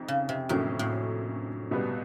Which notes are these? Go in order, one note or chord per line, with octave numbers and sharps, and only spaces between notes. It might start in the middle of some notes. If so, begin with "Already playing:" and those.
Already playing: F2 C3 D#3
C#3
C3
F2 A2 D3 F#3 A#3 C#4
A2
C#2 B2 G3 B3